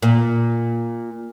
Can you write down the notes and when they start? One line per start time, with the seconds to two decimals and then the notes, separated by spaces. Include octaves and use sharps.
0.02 A#2